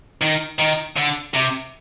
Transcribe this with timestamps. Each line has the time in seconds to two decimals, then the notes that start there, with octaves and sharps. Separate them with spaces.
0.21 D#3
0.59 D#3
0.96 D3
1.34 C3